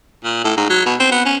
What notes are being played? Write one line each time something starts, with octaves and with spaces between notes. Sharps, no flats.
A#2
A2
G#2
F#3
B2
C4
B3
C#4